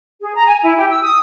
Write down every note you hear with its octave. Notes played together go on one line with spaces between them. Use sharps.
G#4
A#5
G#5
E4
G4
E6
D#6